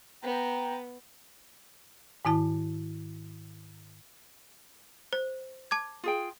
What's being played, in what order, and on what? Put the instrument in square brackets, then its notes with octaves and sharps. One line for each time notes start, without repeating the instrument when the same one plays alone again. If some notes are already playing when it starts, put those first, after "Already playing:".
[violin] B3 [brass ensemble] G5 A#5
[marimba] G#2 D#3 E4 A5
[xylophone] C5
A5 D6 G#6
[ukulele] F4 G#4 G5